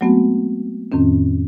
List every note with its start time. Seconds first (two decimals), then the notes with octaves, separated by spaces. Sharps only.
0.01 F#3 G#3 A3 B3 C4 F#4
0.92 F2 A2 D#3 C4 C#4